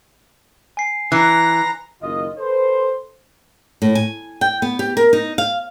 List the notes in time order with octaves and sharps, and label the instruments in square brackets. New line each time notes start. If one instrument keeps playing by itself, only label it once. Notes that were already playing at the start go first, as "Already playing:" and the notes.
[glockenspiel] G#5 C7
[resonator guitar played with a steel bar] E3 [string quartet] A#5 [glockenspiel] F#6 C7 C#7
[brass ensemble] F#1 D#3 F4 D#5
A4 B4 C5
[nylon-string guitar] A2
G#5
G5
B3
G4
A#4
D#4
F5